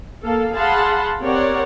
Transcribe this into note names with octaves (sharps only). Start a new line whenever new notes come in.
A#3 A4 F5
G#4 F5 F#5 A5 B5 C6
C4 G4 A#4 C#5 D5 F#5